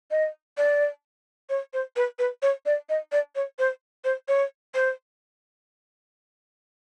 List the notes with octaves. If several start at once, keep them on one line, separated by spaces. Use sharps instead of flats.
D#5
D5
C#5
C5
B4
B4
C#5
D5
D#5
D5
C#5
C5
C5
C#5
C5